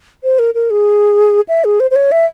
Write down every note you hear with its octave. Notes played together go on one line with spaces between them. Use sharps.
C5
A#4
A#4
G#4
E5
G#4
C5
C5
C#5
E5